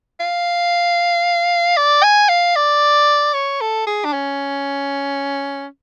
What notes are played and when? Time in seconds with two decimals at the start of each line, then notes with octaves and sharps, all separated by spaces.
0.20 F5
1.77 D5
2.03 G#5
2.29 F5
2.56 D5
3.34 C#5
3.61 A4
3.87 G#4
4.05 D4
4.13 C#4